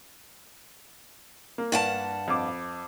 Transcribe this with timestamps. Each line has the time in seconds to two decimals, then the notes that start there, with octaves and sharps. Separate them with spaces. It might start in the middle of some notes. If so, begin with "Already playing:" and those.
1.58 A#3
1.72 G2 F#5 A5
2.28 F2 D6